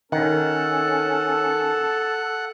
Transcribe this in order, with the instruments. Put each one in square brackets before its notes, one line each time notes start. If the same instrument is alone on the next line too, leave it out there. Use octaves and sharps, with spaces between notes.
[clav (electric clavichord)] D#3 [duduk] C#4 [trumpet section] A4 [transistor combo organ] F#5